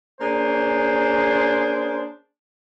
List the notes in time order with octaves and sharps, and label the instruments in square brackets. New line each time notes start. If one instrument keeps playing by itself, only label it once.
[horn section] A#3 C#4 D4 G#4 C5